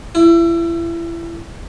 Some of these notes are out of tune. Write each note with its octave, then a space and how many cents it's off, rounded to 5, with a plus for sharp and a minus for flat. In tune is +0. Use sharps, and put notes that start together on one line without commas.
E4 +30